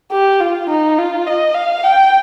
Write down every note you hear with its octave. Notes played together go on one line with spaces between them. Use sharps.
G4
F4
D#4
F4
D#5
F5
G5